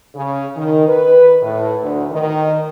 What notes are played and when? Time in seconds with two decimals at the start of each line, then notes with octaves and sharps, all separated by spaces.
0.15 C#3
0.56 D#3
0.87 B4
1.42 A2
1.82 D2
2.12 D#3